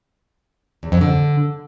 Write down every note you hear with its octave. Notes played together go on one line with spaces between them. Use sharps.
E2
F2
D3